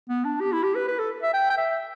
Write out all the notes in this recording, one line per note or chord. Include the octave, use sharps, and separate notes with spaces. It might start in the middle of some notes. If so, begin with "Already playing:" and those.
B3
D4
G4
E4
G4
B4
B4
A4
E5
G5
G5
E5